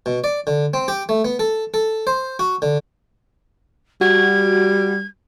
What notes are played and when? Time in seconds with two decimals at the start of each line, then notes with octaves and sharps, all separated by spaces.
0.06 B2
0.24 D5
0.47 D3
0.74 C4
0.88 G4
1.09 A3
1.25 B3
1.39 A4
1.74 A4
2.07 C5
2.39 F#4
2.62 D3
4.01 G3 F#4 G#6